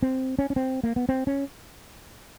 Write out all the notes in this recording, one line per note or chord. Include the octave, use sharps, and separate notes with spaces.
C4
C#4
C#4
C4
A#3
B3
C4
C#4